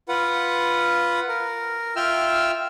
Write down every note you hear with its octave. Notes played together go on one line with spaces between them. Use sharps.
F4 B4 F#5
A#4
F4 E5 G5 E6 F6